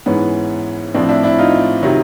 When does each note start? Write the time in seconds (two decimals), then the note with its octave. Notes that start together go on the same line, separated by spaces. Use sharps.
0.06 G#2 E3 B3 C#4
0.94 A2 F3 C4 D4
1.09 D4 E4
1.23 D4 E4
1.38 D#4 F4
1.83 C3 D#3 F#3